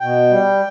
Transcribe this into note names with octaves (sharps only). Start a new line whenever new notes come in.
B2 G5
G3